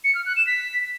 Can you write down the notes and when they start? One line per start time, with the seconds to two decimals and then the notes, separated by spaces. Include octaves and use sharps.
0.04 C#7
0.15 F6
0.26 F#6
0.36 E7
0.47 B6